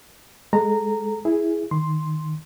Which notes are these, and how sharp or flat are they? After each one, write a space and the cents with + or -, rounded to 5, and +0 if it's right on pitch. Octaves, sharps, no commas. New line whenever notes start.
G#3 +0 A4 -20 A#5 -15
E4 +0 G#4 +0
D#3 +0 C6 +0